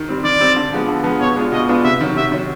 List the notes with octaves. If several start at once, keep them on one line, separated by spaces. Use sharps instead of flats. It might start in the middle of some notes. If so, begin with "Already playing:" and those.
Already playing: D#3
G3 C4
D#3 D5
G3 C4
D3
F3 G#3 B3
D3
F3 G#3 B3
B2 C#5
G#3 B3 D4 F4
B2 D#5
G#3 B3 D4 F4
C3 E5
D#3 F#3
C3 E5
D#3 F#3